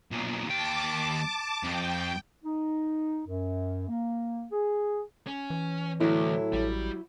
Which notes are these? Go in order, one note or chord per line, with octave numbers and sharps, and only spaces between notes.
B1 A#2
D#2 G5 A5 D6
F2 G5
D#4
F#2
A#3
G#4
C#4
E3
D2 A2 F#3 E4
A1 G3